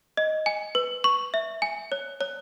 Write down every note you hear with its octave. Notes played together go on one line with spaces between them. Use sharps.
D#5
G#5
B4
C#6
E5
G#5
C#5
C#5